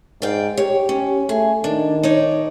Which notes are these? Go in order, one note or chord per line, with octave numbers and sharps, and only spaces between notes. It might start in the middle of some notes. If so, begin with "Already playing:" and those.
G#2 D5 F5 G5
G4 C#5
C#4
A3 G#4
D#3 D4
D#4 C#5 D5